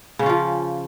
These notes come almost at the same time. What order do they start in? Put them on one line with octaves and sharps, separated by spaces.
C#3 C#4 F4 F3